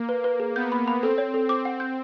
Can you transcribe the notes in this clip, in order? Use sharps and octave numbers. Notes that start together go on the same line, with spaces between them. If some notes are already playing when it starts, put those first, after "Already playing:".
Already playing: A#3
B4
B4
G#4
B3 G6
B5
B5
C4 A4
C#5
A4
C4 D6
F#5
G6